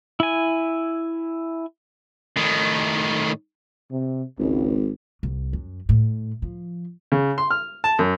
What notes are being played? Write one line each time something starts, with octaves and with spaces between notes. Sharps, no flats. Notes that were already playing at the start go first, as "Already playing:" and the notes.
E4 G#5
A2 D#3
C3
G#1 C#2
C2
F#2
A2
F3
C#3
C6
F6
A5
F#2